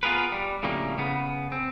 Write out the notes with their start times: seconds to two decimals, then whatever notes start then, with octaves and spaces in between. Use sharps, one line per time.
0.03 B3 F4 F#4 G#4 A#4 B4
0.32 G3
0.63 F2 A2 C#3 G3 A#3
0.98 C#3 B3
1.52 C4